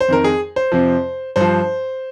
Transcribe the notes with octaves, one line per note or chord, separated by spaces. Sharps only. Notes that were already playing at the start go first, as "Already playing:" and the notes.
C5
F2 D#3 A#4
G#4
C5
F2 C3 F3
G2 F3 C5